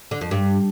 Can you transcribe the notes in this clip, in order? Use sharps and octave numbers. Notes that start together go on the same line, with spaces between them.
D3
F2
G2